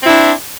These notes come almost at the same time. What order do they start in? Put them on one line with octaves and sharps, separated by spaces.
C4 E4 D4